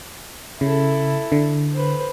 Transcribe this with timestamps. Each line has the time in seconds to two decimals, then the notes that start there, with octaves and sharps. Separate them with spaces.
0.61 C#3 E4 A4
1.32 D3
1.73 B4 C5